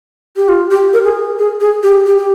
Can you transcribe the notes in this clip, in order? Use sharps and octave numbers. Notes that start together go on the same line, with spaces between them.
G4
F4
G4
A#4
G#4
G#4
G#4
G4
G4
G4